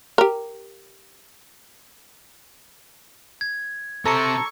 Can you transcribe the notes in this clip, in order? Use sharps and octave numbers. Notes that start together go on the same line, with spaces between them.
G4 A#4
G#6
C3 A4 C5 A5 A#5 C#6 E6 C#7